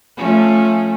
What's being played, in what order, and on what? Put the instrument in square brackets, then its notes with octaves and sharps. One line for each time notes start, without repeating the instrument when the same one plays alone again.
[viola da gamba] F3 A3 C#4